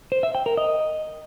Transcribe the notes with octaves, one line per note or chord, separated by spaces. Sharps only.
C5
E5
G5
A#4
D#5